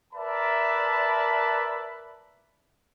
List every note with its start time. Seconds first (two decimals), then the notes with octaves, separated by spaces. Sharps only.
0.14 A#4 B4 D5 E5 A5 B5